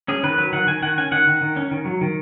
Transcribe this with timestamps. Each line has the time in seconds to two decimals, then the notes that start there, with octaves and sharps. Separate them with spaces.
0.08 C#4 G#4
0.23 D#3 B4
0.38 F#3 B4
0.53 D#3 F#5
0.67 D#3 G#5
0.82 D#3 F#5
0.98 C#4 G#5
1.11 D#3 F#5
1.27 D#3
1.41 D#3
1.56 C#4
1.71 D#3
1.85 F#3
2.01 D#3